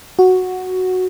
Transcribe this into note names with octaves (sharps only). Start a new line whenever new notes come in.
F#4